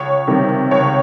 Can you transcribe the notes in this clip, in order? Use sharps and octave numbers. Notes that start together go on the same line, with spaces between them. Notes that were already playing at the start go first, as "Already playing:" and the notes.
Already playing: C#2 C#5
C3 D#3 G3
C#2 C#5